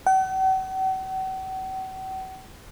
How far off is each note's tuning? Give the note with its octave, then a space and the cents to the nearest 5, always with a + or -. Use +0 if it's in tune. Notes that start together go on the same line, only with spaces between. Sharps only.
F#5 +45